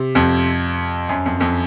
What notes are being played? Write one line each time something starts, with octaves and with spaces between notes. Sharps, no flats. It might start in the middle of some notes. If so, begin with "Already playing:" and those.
Already playing: C3
F2
F#2
F2
F2